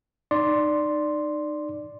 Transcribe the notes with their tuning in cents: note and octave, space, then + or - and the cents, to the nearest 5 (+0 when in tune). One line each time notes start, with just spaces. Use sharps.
D#4 -30 D5 +0 C6 +0